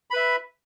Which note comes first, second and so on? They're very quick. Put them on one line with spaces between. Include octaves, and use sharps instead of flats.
B5 B4 E5